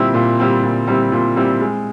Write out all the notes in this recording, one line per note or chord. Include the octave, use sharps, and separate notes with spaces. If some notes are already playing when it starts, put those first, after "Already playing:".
Already playing: A#2 G3 C4 E4
A#2
G3 C4 E4
A#2
G3 C4 E4
A#2
G3 C4 E4
G#3